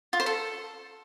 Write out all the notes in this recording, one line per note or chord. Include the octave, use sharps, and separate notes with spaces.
F4
C5
A4